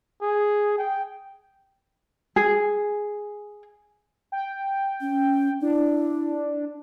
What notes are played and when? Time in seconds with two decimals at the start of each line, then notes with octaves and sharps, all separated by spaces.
0.22 G#4
0.78 G5
2.36 G#4
4.32 G5
5.01 C#4
5.62 D4 E4